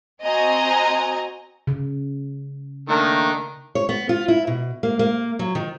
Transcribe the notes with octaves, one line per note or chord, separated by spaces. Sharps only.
C4 F#4 D#5 G#5 A#5
C#3
D#3 A3 A#3 D4 A#4
C#5
B3
F4
E4
B2
A#3
A#3
F#3
D#3